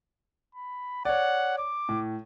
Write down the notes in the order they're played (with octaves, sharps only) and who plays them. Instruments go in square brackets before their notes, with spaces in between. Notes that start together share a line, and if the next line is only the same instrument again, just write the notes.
[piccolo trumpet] B5
[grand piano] C#5 D5 [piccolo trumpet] F#5
[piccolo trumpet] D6
[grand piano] A2